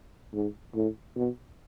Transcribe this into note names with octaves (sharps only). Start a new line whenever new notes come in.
G#2
A2
B2